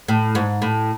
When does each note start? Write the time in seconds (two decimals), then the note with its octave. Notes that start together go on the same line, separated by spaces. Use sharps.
0.08 A2
0.35 G#2
0.62 A2